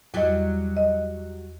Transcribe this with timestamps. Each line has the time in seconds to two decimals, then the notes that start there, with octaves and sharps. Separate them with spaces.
0.14 E2 F#3 G3 D#5
0.77 D#5